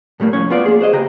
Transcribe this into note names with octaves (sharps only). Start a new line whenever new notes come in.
A2 G3 A3 A#3
C2 F2 A2 C#4 C#5
B3 F4 D5
A#3 G#4
G#4 C5 D#5
C#3 G4 A#5